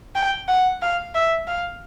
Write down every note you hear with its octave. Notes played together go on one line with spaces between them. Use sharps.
G5
F#5
F5
E5
F5